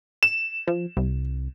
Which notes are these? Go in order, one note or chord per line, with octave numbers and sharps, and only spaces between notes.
E7
F3
C2